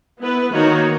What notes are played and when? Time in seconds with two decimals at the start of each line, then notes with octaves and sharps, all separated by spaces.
0.21 B3 E4 B4
0.52 D#3 A#3 D#4 F#4 C#5